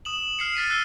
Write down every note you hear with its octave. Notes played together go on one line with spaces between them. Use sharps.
D#6 E7 F#7
F6 C7 C#7
F6 A6 B6 D#7
E6 F#6 C7 G7